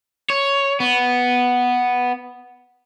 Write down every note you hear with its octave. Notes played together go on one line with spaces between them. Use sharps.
C#5
B3